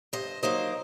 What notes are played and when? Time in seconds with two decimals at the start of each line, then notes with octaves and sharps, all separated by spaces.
0.13 G2 C5 D#5
0.43 F#3 A#3 D#4 C5 D#5